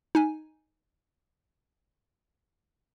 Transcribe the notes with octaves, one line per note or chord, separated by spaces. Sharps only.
D#4 G#5